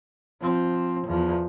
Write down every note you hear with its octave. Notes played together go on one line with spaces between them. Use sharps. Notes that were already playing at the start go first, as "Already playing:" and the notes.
F3 C4
E2 F3